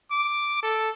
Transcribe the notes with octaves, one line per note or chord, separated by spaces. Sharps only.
D6
A4